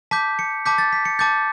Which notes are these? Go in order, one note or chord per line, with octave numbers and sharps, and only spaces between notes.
A5 D6 G6 B6
C#7
A5 D6 G6 B6
A6
B6
C#7
A5 D6 G6 A6